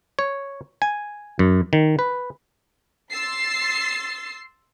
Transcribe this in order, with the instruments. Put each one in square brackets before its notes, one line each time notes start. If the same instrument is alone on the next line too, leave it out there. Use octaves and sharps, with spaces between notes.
[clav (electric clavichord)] C#5
G#5
F#2
D#3
B4
[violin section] C6 E6 A6 C7